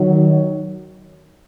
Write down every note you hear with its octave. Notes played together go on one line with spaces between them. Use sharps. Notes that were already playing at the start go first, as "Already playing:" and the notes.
Already playing: D#3 F#3